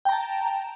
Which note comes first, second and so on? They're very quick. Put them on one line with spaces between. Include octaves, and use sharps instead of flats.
G5 A#5 A5